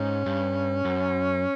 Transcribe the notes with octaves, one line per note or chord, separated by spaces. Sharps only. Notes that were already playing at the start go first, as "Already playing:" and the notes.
Already playing: G#2 C#4
G2
F#2